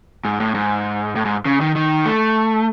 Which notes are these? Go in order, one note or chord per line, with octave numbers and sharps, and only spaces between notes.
G#2
A2
G#2
A2
G#2
C#3
D#3
D#3
A3